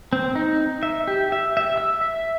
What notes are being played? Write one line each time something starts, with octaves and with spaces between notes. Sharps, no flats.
C4
D#4
E5
G4
E5
E5
E6
E5